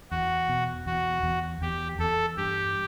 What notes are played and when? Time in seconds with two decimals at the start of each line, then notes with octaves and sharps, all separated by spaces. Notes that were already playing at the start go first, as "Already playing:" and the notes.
0.11 E2 F#4
0.49 B2
0.86 E2 F#4
1.23 E2
1.62 E2 G4
1.99 E2 A4
2.37 G2 G4